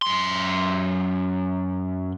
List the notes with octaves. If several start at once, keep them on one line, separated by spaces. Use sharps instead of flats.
F#2 C6